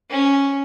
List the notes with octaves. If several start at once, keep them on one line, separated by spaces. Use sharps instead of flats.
C#4